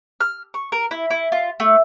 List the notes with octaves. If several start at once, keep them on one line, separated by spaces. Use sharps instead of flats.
F6
C#6
A#4
E4
E4
F4
A3